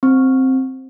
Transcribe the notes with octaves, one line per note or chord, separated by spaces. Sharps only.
C4